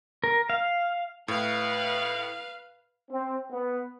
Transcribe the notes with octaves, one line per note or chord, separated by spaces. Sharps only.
A#4
F5
A2 B4 F5
C4
B3